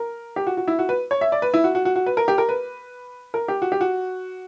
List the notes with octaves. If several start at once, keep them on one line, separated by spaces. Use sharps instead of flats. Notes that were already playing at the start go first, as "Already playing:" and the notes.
Already playing: A#4
G4
F#4
F#4
E4
F#4
B4
C#5
E5
D5
B4
E4
F#4
F#4
F#4
F#4
B4
A#4
G4
A#4
B4
A#4
G4
F#4
G4
F#4